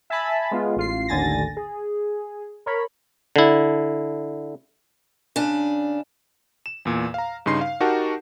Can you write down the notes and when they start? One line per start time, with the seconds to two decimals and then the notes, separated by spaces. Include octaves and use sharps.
0.10 E5 G#5 A5 B5
0.51 G#3 B3 F4
0.76 A1 F4 C7
1.08 A1 D#2 D3 G#5 A6 A#6
1.57 G#4
2.66 A#4 C#5 B5
3.36 D3 E4
5.36 C#3 D4
6.66 E7
6.85 E2 A#2
7.14 F5 A#5
7.46 G2 C#3 D#4 C6 C7
7.61 F5
7.80 D#4 F#4 G4 A#4 F#5 A5